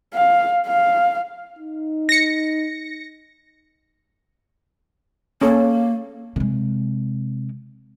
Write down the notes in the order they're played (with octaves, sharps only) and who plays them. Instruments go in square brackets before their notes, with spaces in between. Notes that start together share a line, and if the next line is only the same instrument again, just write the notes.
[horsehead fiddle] F5
F5
[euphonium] D#4
[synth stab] A#6 C#7
[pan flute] A#3 [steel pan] C#4 A4
[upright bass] C3 G#3